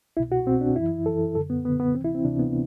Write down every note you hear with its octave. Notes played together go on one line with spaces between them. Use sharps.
C2 B2 E4
F#4
C2 B2 C4
D4
F#2 E3 E4
F#2 E3 A4
F#2 D3 A4
B3
F#2 D3 B3
B3
D2 C3 E3 C4
E4
C4
D2 C3 E3 D4
B3